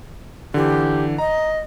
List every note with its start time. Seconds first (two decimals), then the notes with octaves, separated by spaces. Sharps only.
0.54 D3 E3 G4
1.18 D#5 A#5